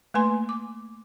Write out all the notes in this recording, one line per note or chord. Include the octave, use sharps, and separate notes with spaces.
A3 A#3 B4 G#5 C6
D6